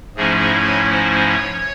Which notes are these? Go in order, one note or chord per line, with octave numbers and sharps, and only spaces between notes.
G#2 F3 A3 C#4 E4 G#4
C#5
C5
C#5